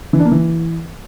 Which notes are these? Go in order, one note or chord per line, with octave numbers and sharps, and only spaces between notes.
E3
D4
A#3
E3